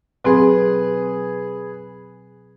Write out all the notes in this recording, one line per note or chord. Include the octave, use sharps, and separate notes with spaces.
B2 F#3 C4 G#4 B4